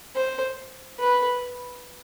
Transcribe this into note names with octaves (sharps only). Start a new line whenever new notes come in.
C5
B4